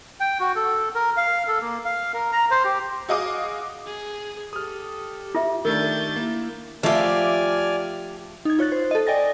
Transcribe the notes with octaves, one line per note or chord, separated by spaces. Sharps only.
G5
F#4
A4
A#4
F5
A4
A#3
F5
A#4
A#5
C5
G4
F#4 G#4 D#5 F5 D6 D#6
G#4
G4 A4 D#6 F6
F4 E5
D#3 A3 D4 A#4 G6 A6
A#3 E4
F3 A3 G4 D5 F5 G#5 F6
D#4 G#6
F4 C#5 F#6 A6
C5
A4 D#5
D5 D#5 G5 G#5 A6 A#6